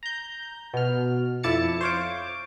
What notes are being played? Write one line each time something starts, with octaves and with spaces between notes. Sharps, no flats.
A#5 G6
B2 F6
F2 E4 D5 A5 A6 C#7
C5 C#5 F5 D6